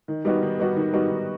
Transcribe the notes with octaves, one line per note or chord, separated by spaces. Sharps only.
D#3
G3 B3 D#4 F#4
D#3
G3 B3 D#4 F#4
D#3
G3 B3 D#4 F#4
D#3